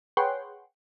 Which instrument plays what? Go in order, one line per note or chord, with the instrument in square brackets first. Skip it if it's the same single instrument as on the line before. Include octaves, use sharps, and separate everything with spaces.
[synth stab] G#4 B4 C#5 F#5 G5 C6